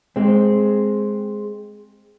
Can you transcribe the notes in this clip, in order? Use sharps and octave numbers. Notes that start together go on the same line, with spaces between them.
G#3 C4